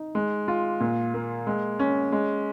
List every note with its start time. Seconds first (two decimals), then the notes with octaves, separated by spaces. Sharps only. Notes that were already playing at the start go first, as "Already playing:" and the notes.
Already playing: D#4
0.15 G#3
0.48 F4
0.81 A#2
1.14 A#3
1.47 G#3
1.79 C#4
2.12 G#3